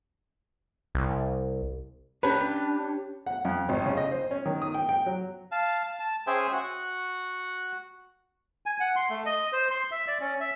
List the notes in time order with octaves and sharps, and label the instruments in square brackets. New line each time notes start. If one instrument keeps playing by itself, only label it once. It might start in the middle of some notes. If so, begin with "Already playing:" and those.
[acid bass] C2
[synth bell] C#4 A5 [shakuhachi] D4 [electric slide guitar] G4 C#5 [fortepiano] B4
[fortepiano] F#5
F2
G#1
C#3
D#5
C5
C#4
D#3
D#6
G5
G5
F#3
[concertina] F5 A5
A5
C#4 G#4 C5 E5 G5 G#5
F#4 F#5
G#5
F#5
C6
A3
D#5
C5
C6
E5
D5
C#4
E5